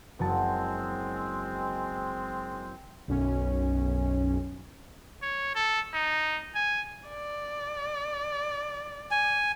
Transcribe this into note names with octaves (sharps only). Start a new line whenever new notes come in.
F#1 F#3 G#3 C4 A5
B1 F#2 C#4
C#5
A4
D#4
G#5
D5
G#5